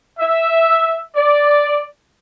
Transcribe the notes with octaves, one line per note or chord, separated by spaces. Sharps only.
E5
D5